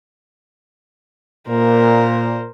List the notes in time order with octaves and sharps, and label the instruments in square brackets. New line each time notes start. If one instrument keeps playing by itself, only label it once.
[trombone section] A#2 [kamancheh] A#4 C5